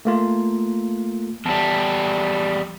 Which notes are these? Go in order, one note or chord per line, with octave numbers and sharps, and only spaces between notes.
A3 A#3 F4
E2 G3 A5